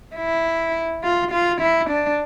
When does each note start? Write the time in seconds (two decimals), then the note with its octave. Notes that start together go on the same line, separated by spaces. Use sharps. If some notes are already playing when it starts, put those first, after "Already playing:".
0.16 E4
1.04 F4
1.32 F4
1.61 E4
1.90 D4